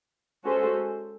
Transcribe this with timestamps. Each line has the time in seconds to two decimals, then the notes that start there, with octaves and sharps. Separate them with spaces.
0.43 G#3 C#4 F#4 A4 C5